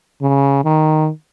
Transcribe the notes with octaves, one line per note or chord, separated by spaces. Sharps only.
C#3
D#3